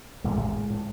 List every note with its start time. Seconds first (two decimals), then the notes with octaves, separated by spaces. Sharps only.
0.24 A1 A2 G#3
0.70 A2